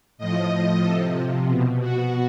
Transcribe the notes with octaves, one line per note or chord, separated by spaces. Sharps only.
A2 F3 D#5
C3 F3 A4
B2
F#4